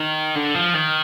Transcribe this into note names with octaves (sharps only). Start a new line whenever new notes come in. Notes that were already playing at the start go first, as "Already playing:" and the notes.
Already playing: D#3
D3
F3
D#3